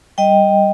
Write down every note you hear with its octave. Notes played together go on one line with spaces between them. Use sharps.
G3 D#5 G5